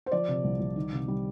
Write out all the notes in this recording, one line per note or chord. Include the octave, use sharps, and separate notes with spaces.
C5
F3 D5
C3
C2
C2
D#3
C3
G3